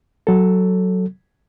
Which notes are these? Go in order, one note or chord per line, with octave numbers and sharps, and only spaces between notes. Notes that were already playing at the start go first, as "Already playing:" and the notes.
F#3 A4